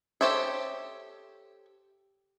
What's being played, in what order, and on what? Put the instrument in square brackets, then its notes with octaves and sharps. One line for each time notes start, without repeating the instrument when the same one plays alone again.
[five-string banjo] G4 A4 C5 C#5 E5